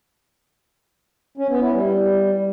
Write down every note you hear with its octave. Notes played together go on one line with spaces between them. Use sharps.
C#4
B3
E4
G3